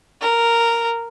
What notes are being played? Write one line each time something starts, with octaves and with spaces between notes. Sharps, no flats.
A#4